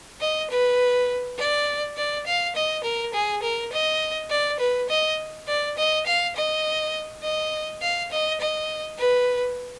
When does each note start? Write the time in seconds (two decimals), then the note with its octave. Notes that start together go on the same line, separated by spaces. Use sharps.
0.21 D#5
0.51 B4
1.38 D5
1.97 D5
2.26 F5
2.56 D#5
2.84 A#4
3.14 G#4
3.43 A#4
3.72 D#5
4.30 D5
4.60 B4
4.90 D#5
5.48 D5
5.78 D#5
6.06 F5
6.36 D#5
7.23 D#5
7.82 F5
8.11 D#5
8.40 D#5
8.99 B4